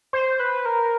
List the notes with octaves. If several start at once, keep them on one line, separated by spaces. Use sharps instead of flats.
C5
B4
A#4